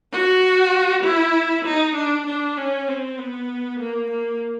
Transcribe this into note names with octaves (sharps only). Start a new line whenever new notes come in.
F#4
E4
D#4
D4
D4
C#4
C4
B3
A#3
A#3